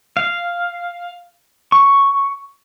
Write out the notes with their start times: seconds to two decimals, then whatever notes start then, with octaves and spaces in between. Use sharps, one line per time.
0.17 F5
1.72 C#6